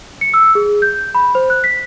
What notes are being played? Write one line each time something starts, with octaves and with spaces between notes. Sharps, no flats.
C#7
E6
G#4
G6
B5
C5
F#6
B6